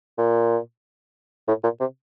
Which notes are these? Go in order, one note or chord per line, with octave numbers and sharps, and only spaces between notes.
A#2
A2
A#2
C3